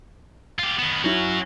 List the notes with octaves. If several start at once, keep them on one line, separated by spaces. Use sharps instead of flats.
F4 G4
D#3 B3 E7
F#3 C#4 E4 F#4